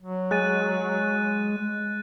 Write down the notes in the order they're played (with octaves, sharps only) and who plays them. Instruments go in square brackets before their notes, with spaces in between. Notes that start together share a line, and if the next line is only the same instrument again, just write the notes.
[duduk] F#3
[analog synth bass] G#3 [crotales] F#6 A6 D#7